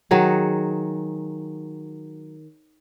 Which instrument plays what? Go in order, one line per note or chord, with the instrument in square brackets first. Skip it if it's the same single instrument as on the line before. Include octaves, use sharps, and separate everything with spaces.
[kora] D#3 F#3 F#4 G#4